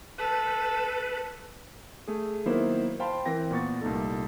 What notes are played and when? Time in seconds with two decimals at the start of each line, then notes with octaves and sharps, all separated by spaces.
0.18 A4 B4
2.08 A3 G#4
2.46 D#3 F#3 A#3 B3 E4 C5
3.00 C5 F5 G5 A5 B5 C6
3.26 E3 C4 A#4 G5 A#6
3.51 A#2 B3 C#6 A6
3.81 C2 A#2 A3 D#4 A4